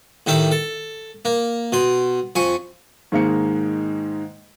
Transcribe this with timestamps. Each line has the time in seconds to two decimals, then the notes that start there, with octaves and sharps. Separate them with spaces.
0.27 A2 D#3 G4 E5
0.51 A4
1.25 A#3
1.72 B2 C6
2.36 F2 G#5 C#6
3.12 G#2 D#3 G#3 A#3 D#4 C#7